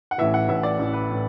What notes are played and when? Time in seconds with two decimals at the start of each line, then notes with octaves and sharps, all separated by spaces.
0.11 F#5
0.18 A1 A2 E3 E5
0.34 F#5
0.48 A1 A2 E3 E5
0.63 D5
0.79 A1 A2 E3
0.93 B4
1.10 A2 E3